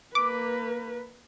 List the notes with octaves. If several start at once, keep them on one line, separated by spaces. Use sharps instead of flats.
A#3 B4 D6